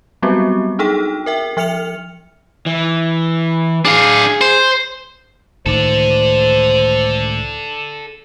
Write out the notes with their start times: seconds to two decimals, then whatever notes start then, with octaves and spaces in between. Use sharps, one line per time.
0.22 F#3 G3 B3 C4 F#4 G4
0.79 D4 D#4 G#4 A4 G5
1.26 A#4 E5 G5
1.57 F3 E5 F6 C#7 F7
2.66 E3
3.85 D4 G#4 F5
4.41 C5
5.66 C#2 A2 D#3 A4 C5 D5